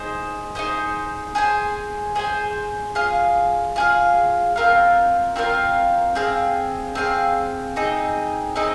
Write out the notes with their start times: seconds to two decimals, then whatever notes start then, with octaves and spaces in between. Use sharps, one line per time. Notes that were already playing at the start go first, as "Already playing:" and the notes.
Already playing: D#4 G#4 C5
0.55 D#4 G#4 C5
1.35 G#4 C5 G#5
2.15 G#4 C5 G#5
2.95 F4 G#4 F5
3.76 F4 G#4 F5
4.56 C4 F4 A#4 F5
5.36 C4 F4 A#4 F5
6.15 C4 G#4 F5
6.95 C4 G#4 F5
7.76 C4 D#4 G#4 D#5
8.56 C4 D#4 G#4 D#5